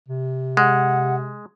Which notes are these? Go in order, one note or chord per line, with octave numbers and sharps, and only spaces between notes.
C3
G#3 F#5